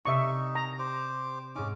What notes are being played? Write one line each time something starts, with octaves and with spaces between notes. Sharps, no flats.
C3 D#4 D5 E5 C#6
A#5
G4 C5 D6
G#2 C#4 D#4 D6